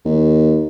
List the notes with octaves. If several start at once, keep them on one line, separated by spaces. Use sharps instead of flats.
D#2